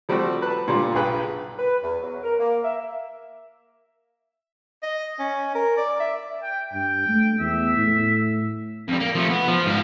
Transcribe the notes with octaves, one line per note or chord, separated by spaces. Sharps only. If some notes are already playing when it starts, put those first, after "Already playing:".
F3 G3 A3 C4 F#4
B4 A5
A#2 D3 G3 F4
B1 G2 G#4 B4 G5
B4
E2
F#3
A#4
A#3
E5
D#5
C#4
A#4
D5
E5
G5
G2 G5
A3
E2 E5
A2
F2 G3
A#3
F3 A3
B3
F3
G#2 F5